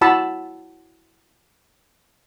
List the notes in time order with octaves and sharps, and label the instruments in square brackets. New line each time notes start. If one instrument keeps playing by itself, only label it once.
[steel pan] E4 F#4 A5 B5 E6